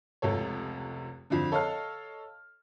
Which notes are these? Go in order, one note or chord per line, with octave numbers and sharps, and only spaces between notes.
F1 C#2 C3 A4 C#5
F2 D3 F3 D4
A4 C#5 D#5 F5 A5 F6